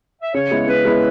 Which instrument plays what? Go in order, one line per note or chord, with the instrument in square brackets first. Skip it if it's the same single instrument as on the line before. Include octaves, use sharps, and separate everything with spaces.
[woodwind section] E5
[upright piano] C#3 [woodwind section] C#5
[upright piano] G#3 B3 E4
[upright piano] C#3 [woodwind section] B4
[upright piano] G#3 B3 E4